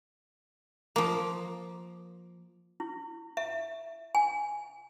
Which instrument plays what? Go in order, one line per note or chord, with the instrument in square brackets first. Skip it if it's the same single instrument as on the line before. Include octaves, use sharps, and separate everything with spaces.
[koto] F3 A#3
[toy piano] E4
E5
G#5